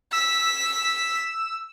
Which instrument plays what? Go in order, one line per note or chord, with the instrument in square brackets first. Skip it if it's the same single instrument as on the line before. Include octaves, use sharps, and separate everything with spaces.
[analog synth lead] E6 [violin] B6